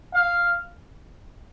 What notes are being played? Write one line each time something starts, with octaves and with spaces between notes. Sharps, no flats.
F5